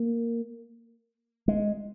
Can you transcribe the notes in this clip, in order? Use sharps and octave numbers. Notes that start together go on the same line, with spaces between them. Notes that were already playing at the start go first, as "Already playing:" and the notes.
Already playing: A#3
G#3